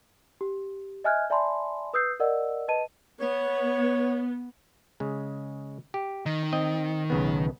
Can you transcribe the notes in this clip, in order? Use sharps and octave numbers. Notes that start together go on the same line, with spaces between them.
G4
D#5 E5 G#5 F6 F#6 G#6
D5 E5 G#5 A5 B5 C6
B4 D#6 E6 G6 C7
A#4 D5 D#5 F#5 E6
B4 D#5 A5 D#7
B3 C#5
C#3 G#3
G4
D#3 D#4
C4 D#5
B1 C#3 B3